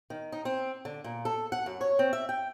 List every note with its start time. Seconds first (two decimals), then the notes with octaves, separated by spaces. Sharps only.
0.10 D#3
0.32 D#4
0.45 C4
0.85 D3
1.04 A#2
1.25 A4
1.52 F#5
1.66 F#2
1.81 C#5
1.99 C4
2.13 E5
2.29 G5